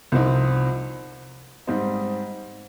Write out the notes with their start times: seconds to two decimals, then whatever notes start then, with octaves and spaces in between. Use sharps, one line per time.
0.12 C2 C3 F3 C4 D#4
1.67 G#2 G3 C4 D#4